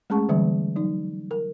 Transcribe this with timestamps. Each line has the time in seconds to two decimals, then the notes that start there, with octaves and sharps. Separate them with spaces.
0.10 G#3 A3 C#4 G#4 A5 C#6
0.29 D3 E3 G3 A#3
0.76 F#3 D#4
1.31 A#4